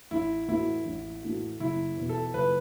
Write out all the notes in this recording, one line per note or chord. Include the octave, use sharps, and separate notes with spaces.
A1 E4
A2 E3 A3 E4 F#4
A1
A2 E3 A3 F#4
F#1 E4
E2 B2
A4
F#1 B4